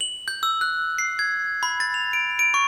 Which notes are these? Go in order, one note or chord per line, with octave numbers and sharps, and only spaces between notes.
F#7
G6
E6
F#6
C7
G#6
B5
A6
F7
D7
D7
C#6